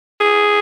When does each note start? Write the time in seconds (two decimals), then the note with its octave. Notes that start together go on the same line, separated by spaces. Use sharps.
0.20 G#4